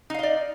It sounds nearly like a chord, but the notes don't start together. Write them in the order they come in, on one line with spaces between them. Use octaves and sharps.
D#4 F5 D#5 D5